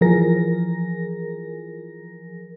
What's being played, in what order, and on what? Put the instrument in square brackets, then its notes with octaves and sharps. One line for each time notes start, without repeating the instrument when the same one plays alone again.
[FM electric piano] E3 F3 G#4 A#4 A#6